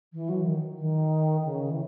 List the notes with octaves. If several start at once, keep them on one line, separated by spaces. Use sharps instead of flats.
E3
F#3
D#3
D#3
C#3
E3